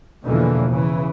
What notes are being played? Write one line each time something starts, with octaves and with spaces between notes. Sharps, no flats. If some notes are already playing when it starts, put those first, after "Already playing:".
E2 B2 D3 E3 F3 A#3
C#3 E3